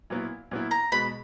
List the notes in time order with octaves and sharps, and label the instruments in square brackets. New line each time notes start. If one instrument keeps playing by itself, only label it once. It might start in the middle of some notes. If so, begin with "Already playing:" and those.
[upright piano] A#2 F#3 B3 E4
A#2 F#3 B3 E4
[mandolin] A#5
[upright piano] B2 G#3 B3 [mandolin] B5